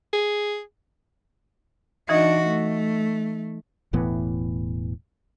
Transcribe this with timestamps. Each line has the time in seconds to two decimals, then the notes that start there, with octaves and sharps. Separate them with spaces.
0.13 G#4
2.09 E3 D4 D#4 F#4 D#5
2.46 A3
3.93 E1 A2 E3 B3